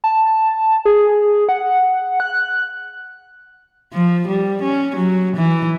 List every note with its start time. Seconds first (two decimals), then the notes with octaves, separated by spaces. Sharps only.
0.04 A5
0.85 G#4
1.49 F#5
2.20 F#6
3.93 F3
4.27 G3
4.63 C#4
4.96 F#3
5.36 E3